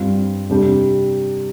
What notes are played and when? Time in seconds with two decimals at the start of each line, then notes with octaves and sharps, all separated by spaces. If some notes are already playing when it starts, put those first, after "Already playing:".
Already playing: G2 G3 C4 F4
0.49 C3 G3 D4 G4